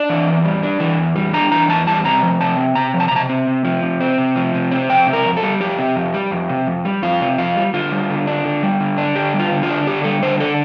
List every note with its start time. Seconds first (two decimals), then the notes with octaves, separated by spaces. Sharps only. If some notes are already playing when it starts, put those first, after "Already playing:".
Already playing: D4 D5
0.10 E3
0.27 E2
0.44 G3
0.63 D4
0.80 E3
0.98 E2
1.16 G3
1.33 D4 A#5
1.52 E3 A#5
1.69 E2 A5
1.87 G3 A5
2.05 C3 A#5
2.22 F3
2.41 C3 A5
2.58 C4
2.75 C3 A#5
2.94 F3
3.00 A5
3.08 A#5
3.11 C3 A5
3.29 C4
3.47 C3
3.65 F3
3.83 C3
4.01 C4
4.18 C3
4.36 F3
4.54 C3
4.72 C4
4.89 F2 G5
5.07 C3
5.13 A#4
5.25 F2
5.37 A4
5.43 G3
5.60 F2 G4
5.78 C3
5.96 F2
6.14 G3
6.31 F2
6.49 C3
6.67 F2
6.85 G3
7.02 F2 F4
7.21 C3
7.38 F2 F4
7.56 G3
7.74 D3 F4
7.92 G3
8.10 D3
8.27 D4
8.45 D3
8.63 G3
8.80 D3
8.98 D4
9.15 D3 G4
9.34 G3
9.39 F4
9.51 D3
9.63 F4
9.70 D4
9.87 D3 G4
10.04 G3 A4
10.23 D3 C5
10.40 D4 A4